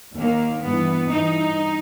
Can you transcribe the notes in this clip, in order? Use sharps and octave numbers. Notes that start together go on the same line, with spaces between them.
D#2 D#3 A#3
G2 E3 B3
G2 E3 D#4